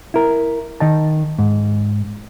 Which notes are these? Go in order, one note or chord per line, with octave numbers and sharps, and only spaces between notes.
E4 A#4
D#3 D#5 A5
G#2